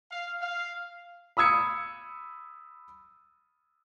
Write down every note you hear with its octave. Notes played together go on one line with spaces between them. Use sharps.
F5
F5
B5 D#6 E6 G#6 C#7